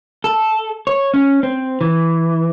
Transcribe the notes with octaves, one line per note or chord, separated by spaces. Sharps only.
A4
C#5
C#4
C4
E3